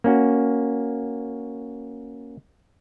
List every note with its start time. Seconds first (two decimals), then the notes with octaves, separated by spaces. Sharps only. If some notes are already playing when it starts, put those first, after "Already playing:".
0.04 A#3 C#4 F#4